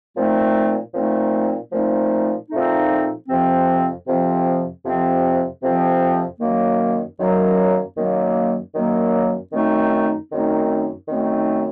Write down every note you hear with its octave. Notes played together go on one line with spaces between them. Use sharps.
A#2 F3 A3 C4 D#4
A#2 F3 A3 C4 D#4
A#2 F3 A3 C4 D#4
A#2 F3 A3 C4 D#4
F2 C3 F3 C4
F2 C3 F3 C4
F2 C3 F3 C4
F2 C3 F3 C4
F#2 D#3 F#3 A#3
F#2 D#3 F#3 A#3
F#2 D#3 F#3 A#3
F#2 D#3 F#3 A#3
F#2 D#3 A3 C4 D#4
F#2 D#3 A3 C4 D#4
F#2 D#3 A3 C4 D#4